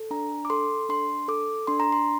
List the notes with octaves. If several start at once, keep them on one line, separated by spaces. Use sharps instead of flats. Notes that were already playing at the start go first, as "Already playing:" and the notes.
Already playing: A4
D4 A#5
D6
A4 C6
D4 C6
A4 D6
D4 C6
A#5
C6